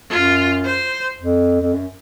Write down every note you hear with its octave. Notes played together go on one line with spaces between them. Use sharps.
F#2 F4
C5
F2
F2
F#2